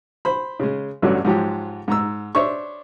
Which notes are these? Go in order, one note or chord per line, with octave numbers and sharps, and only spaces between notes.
C5 B5
C#3 G#3
A1 G2 D3 F#3 C#4 F#4
G#2 F3 F#3 G4
G#2 A#5 E6
D4 C5 C#5 E5 C#6